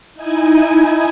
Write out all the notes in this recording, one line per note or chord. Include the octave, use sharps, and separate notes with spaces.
D#4 E4 G#5